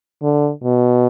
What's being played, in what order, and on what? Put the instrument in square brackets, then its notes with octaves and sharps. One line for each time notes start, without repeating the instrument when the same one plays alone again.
[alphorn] D3
B2